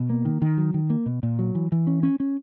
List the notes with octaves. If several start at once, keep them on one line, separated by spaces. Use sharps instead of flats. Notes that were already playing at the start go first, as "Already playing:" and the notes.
Already playing: B2
A#3
D#3
D#3
F#3
D#3
A#3
B2
A#2
F#3
E3
E3
C#4
C#4
C#4